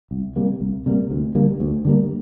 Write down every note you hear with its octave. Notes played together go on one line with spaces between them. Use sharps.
C2
C3 G3 A#3
C2
C3 G3 A#3
D2
D3 G3 A#3
D2
D3 G3 A#3